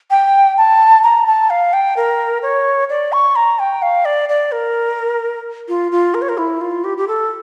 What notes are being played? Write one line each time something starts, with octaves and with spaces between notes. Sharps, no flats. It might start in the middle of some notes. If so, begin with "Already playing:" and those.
G5
A5
A#5
A5
F5
G5
A#4
C#5
D5
C#6
A#5
G5
F5
D5
D5
A#4
F4
F4
A#4
C#5
A#4
E4
F4
G4
G4
A4